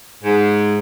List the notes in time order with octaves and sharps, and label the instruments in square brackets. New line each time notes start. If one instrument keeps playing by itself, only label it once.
[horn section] G#2